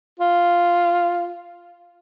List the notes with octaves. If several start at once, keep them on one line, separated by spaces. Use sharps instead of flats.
F4